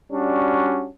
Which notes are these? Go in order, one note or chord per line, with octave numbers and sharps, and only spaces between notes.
G3 C#4 D4 F#4